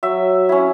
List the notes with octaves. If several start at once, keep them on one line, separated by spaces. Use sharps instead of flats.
F#3 E5
C#4 E4